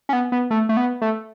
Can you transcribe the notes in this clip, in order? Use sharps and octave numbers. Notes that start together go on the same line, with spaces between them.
C#4
B3
B3
A3
A3
B3
A3